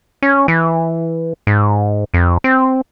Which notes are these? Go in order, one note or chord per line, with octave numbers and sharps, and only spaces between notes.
C#4
E3
G#2
F2
C4